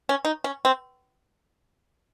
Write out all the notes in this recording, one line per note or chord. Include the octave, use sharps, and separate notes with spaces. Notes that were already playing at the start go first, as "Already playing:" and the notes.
C#4
D#4
C#4
C4